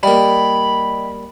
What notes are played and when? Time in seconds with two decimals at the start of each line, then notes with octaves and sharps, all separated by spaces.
0.03 G3 A#3 D5 D#5 G5 B5